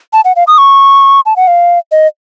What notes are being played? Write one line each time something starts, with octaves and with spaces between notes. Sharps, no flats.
A5
F#5
F5
D#6
C#6
A5
F#5
F5
D#5